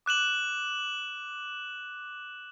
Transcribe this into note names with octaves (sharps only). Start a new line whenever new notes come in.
D6 F#6 E7 F#7